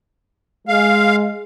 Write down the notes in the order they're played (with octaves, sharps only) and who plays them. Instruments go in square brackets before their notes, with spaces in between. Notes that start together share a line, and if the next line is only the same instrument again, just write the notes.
[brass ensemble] G#3 [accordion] F5